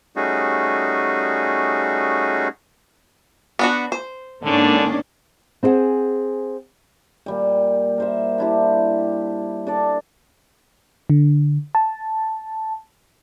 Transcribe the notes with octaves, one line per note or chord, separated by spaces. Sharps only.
G3 A3 C#4 D#4 F#4 G#4
B3 D4 F#4
C5
G#2 D3 D#3 A#3 C#4 D4
C4 E4 G#4 C5 F#5 G#5
A#2 G3 G5
A#4 C5 E5
D4 E4 G4
D4 A4 D5
D3
A5